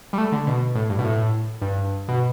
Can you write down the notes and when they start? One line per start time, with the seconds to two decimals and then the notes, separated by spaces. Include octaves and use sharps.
0.13 G3
0.18 A3
0.32 D3
0.47 B2
0.75 A2
0.89 G2
0.98 B2
1.04 A2
1.61 G2
2.08 B2